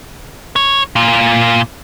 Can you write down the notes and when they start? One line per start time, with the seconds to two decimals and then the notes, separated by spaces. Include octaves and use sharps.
0.56 C#5
0.96 A#2 F4